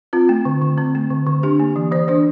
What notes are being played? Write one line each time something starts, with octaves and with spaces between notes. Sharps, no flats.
C4 F4
A3
D3
D3
C4
A3
D3
D3
D4 G4
A#3
E3
E3 C5
D4 C5